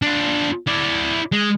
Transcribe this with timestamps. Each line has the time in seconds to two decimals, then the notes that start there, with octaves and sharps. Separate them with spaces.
0.02 D4 F4
0.67 E4 D5
1.32 G#3